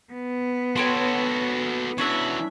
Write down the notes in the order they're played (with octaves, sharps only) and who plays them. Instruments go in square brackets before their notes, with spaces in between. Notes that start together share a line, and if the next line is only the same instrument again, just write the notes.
[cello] B3
[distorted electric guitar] F#4 A4 [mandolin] C#5 G5 C6
[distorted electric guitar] E3 F#4 [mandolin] C#4 D4 E5